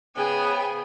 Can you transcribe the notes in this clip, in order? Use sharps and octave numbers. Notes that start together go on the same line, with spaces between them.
G#2 C#3 B3 G#4 G5 G#5